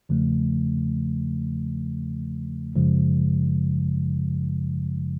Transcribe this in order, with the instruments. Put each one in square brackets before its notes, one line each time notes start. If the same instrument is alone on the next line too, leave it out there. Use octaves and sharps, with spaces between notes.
[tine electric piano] E2 C#3 F3 A3
G#1 F#2 C#3 F3 G#3